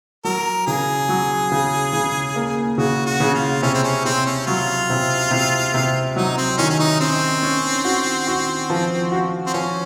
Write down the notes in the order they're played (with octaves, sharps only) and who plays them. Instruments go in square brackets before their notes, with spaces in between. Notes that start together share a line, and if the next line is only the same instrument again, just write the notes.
[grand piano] F#3 [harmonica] A#4
[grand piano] C#3 [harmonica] G#4
[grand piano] F#3
C#3
C#3
A#3
[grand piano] C#3 [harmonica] F#4
[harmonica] F#4
[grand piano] C#3
[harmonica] F4
[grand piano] C3 [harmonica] C#4
[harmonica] C4
C#4
[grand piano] C3 [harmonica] C4
[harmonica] C#4
[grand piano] F#3 [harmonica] F4
[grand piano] C3
C3
C3
[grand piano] F#3 [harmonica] D#4
[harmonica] C4
[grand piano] D#3 [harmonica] C#4
[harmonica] C#4
D#4
[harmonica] C4 [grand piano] C#4
[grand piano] C#4
F#4
F#4
F3
F#4
[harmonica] C4
[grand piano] F3 [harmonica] C#4